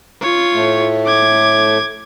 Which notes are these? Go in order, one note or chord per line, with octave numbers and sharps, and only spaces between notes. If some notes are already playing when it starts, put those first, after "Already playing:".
F4 C#5
A2 A3
D6 G#6